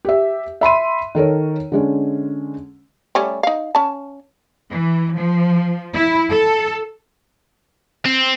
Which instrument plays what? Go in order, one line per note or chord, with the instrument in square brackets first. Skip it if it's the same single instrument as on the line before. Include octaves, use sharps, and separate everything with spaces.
[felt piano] G4 E5
E5 B5 C6 D#7
D#3 A4 A#4 C#5
D3 G#3 C#4
[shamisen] G3 A3 C#4
D#4 F5
C#4 A5
[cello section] E3
F3
E4
A4
[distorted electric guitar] C4